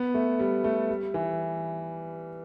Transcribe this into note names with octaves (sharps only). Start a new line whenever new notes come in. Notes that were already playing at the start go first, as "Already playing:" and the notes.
Already playing: B3
A3
G3
A3
G3
E3